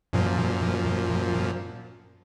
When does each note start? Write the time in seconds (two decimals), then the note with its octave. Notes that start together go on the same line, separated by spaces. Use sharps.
0.13 F#2 A#2 F3